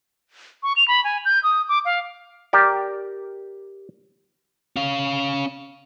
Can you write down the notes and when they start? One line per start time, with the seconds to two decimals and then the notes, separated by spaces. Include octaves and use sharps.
0.63 C#6
0.76 F7
0.88 B5
1.04 G#5
1.25 G6
1.43 D#6
1.69 D6
1.85 F5
2.53 G4 A#4 D5
4.76 C#4 F5